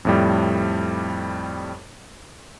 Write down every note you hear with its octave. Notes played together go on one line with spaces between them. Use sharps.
F2 A2 G3